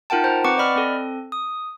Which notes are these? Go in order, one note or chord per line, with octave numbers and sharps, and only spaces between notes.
D#4 F4 A#4 F#5 G5 A5
C5 A#5
C4 B4 F#5 C#6 D6 C#7
D5 D#5 B5 F6
C4 A4
D#6